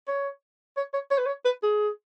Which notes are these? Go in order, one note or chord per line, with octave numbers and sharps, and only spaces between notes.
C#5
C#5
C#5
C#5
B4
C#5
B4
G#4